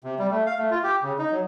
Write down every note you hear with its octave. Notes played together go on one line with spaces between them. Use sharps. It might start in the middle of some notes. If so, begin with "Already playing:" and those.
C3
G3
A3
F5
A3
F4
G4
C#3
D#4
F#3